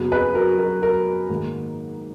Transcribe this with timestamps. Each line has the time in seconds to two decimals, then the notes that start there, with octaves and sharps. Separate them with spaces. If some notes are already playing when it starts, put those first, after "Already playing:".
Already playing: F#2 C#3 F#3 B3
0.12 G#4 B4
0.34 F#4 A#4
0.58 F#4 A#4
0.82 F#4 A#4
1.29 G#2 D#3 A#3